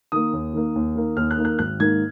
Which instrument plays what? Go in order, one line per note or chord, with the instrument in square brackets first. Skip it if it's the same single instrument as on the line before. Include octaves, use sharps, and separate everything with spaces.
[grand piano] D#3 A#3 D#6
D#2
D#3 A#3
D#2
D#3 A#3
D#2 F6
F#6
D#3 A#3
F#6
G#1 F#6
G#2 D#3 A#3 G#6